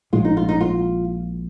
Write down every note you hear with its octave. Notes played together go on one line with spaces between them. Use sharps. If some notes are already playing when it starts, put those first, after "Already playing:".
A#1 A#2 G#3 F4
D#4
F4
D#4
F4